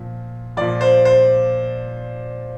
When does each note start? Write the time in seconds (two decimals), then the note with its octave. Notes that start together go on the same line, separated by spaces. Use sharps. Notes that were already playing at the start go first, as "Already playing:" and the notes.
Already playing: A#2 F3
0.57 A#2 F3 D5
0.81 C5
1.05 C5